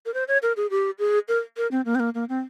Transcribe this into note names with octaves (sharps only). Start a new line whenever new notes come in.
A#4
C5
C#5
A#4
G#4
G4
G#4
A#4
A#4
C4
A#3
C4
A#3
A#3
C4